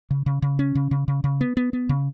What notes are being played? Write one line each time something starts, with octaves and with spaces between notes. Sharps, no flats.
C#3
C#3
C#3
C#4
C#3
C#3
C#3
C#3
B3
B3
B3
C#3